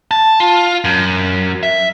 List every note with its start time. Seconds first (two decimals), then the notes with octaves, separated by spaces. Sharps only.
0.11 A5
0.40 F4
0.84 F#2
1.63 E5